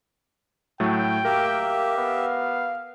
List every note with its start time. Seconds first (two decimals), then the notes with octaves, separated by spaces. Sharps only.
0.80 A2 F#3 A3 G5
1.25 A#3 G4 A#4 E5
1.98 B3 F5